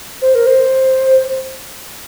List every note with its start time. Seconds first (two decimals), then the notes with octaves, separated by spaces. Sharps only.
0.22 C5
0.35 A#4
0.47 C5